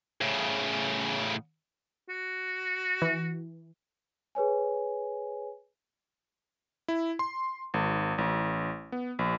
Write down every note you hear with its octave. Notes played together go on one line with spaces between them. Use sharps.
A2 C#3
F#4
E3
G#4 B4 C#5 G#5
E4
C6
G#1
A1
B3
A#1